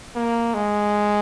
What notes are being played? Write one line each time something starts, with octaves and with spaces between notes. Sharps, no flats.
A#3
G#3